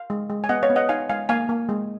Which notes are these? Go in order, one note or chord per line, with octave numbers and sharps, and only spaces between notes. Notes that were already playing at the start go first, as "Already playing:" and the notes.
Already playing: F5
G#3
G#3
G#5
B3 D#5 F#5
C#5 F5
B3
D#5 F#5
D#4 F5 G#5
G#3 F5 G#5
A#3 F5 G#5
A#3
G#3